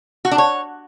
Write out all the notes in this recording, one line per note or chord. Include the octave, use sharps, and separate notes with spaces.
F#4
D4
C#5